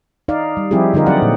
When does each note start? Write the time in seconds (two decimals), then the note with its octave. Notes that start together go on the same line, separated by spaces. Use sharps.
0.28 D#4 D5 F5
0.57 G3
0.71 F3 G3 C4 E4 G4 G#4
0.94 D3 D#4 F4 A#4 D#5
1.06 F#3 C4 G4 D5 F#5
1.22 A#2